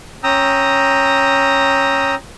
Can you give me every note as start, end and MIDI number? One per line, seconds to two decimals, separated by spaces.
0.24 2.15 61
0.24 2.15 79
0.24 2.15 82
0.24 2.15 87
0.24 2.15 88